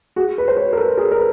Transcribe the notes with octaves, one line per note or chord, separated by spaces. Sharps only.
F#4 G#4
B4
C5
B4 C#5
A#4
A4 B4
G#4 A#4
A#4
B4